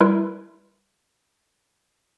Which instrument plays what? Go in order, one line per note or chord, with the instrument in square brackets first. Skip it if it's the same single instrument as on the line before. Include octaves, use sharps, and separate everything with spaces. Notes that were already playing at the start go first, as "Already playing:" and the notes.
[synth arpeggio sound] G3 E4 A#4 B4 C6